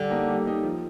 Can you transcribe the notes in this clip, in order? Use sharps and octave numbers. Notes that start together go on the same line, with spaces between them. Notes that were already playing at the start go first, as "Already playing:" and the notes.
Already playing: D3 G3
A#3 D#4 G4
G3
A#3 D#4 G4
F3